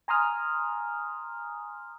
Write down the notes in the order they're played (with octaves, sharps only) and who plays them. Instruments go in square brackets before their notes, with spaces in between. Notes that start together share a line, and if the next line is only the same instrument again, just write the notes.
[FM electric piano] G#5 A#5 C6 D#6 F6